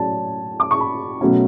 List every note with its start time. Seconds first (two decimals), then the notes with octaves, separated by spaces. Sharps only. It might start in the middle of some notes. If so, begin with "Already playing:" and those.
Already playing: A2 F#3 C#4 C#5 D5 A5
0.60 D6
0.71 C#6
0.80 B5
1.21 B2 F#3 A3 C#4